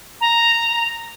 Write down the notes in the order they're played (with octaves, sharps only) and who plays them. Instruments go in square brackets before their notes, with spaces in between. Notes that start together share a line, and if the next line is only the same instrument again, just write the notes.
[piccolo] A#5